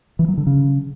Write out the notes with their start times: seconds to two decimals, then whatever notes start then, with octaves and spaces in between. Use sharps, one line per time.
0.19 E3
0.28 F#3
0.37 D3
0.47 C#3